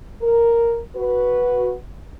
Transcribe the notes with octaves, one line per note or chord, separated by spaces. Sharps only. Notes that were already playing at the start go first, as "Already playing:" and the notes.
A#4
F#4 B4